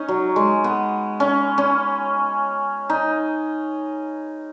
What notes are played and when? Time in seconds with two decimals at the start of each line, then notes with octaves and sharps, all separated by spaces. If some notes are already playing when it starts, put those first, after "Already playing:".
Already playing: C#4 D#4
0.08 F#3
0.36 G#3
0.64 B3
1.20 C#4
1.58 C#4
2.90 D#4